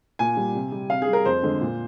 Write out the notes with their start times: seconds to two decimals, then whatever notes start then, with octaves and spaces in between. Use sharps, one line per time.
0.19 A#2 G#5
0.37 G3
0.55 C3
0.72 G3
0.90 C3 F5
1.02 G#4
1.08 G3
1.13 A#4
1.25 F2 C5
1.43 D3 G#3
1.61 A#2